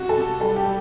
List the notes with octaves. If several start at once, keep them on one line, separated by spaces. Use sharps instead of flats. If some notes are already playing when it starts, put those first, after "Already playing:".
Already playing: C3 F#4
A4
C3
G3 A4
G4
G3